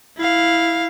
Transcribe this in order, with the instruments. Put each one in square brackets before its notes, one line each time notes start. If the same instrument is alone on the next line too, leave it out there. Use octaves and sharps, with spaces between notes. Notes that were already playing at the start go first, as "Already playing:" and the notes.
[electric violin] E4 F5